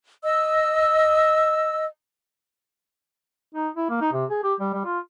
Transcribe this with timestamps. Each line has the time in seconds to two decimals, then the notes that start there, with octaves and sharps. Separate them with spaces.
0.23 D#5 E6
3.55 D#4
3.77 E4
3.90 A#3
4.01 D#4
4.13 C3
4.30 G#4
4.43 G4
4.60 G3
4.74 G3
4.85 F4